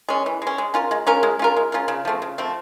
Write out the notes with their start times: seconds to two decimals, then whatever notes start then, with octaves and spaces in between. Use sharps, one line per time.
0.09 G#3 C#4
0.26 E3
0.42 G#3 C#4
0.58 G#3
0.74 C#4 F4 A#4
0.91 G#3
1.07 C#4 F4 A#4
1.23 G#3
1.39 C#4 F4 A#4
1.56 G#3
1.72 C#4 F4 A#4
1.88 C#3
2.05 F3 A3 C4
2.22 C#3
2.38 F3 A3 C4